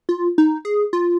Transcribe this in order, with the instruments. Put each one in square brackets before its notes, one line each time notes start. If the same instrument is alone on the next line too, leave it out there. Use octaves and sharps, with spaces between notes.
[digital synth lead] F4
D#4
G#4
F4